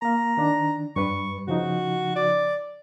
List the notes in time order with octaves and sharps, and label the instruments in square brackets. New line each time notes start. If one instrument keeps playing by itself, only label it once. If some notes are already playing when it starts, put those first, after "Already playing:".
[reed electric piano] A#3 F5 [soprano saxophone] A#5
[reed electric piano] D#3 D4
[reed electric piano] G2 G3 B4 [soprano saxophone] C#6
[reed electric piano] C#3 F3 D#4 [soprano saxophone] F#4
[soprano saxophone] D5